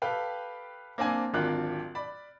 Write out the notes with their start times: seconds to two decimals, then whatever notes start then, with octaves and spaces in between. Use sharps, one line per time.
0.02 G4 A4 B4 F5 G5
0.98 A#3 C4 D4 G#5
1.33 D1 G#1 D4 F4 A#4 F#6
1.95 D5 B5